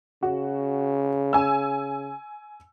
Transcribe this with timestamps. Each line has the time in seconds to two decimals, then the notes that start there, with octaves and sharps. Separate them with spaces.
0.23 C#3 F#4
1.33 G#5 E6